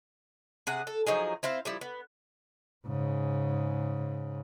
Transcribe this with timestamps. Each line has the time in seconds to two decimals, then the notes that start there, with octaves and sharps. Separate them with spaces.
0.67 C3 G#4 F#5
0.87 A4
1.07 F3 F#3 D#4 G#4
1.43 C4 E4 C5 F5
1.65 F3 G3 E4
1.81 B3
2.86 G#2 C#3